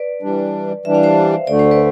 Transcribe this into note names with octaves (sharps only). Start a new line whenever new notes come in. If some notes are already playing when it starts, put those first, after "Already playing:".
Already playing: B4 D5
E3 G3 D4
E3 G3 D4 E5
F5
C5 E5
D2 D3 A3 D5
C5
B4 D5